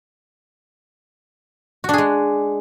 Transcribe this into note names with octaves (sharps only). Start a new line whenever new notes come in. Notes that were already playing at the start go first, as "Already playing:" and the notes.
G#3 D4 F#4 G#4